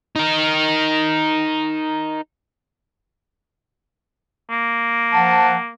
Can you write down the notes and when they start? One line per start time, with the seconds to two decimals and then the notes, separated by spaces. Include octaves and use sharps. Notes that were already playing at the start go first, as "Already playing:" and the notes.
0.16 D#4 A#4
4.50 A#3
5.13 F3 F#5 A5